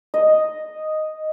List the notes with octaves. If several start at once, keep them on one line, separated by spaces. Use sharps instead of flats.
D#5